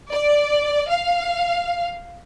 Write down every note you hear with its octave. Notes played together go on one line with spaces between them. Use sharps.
D5
F5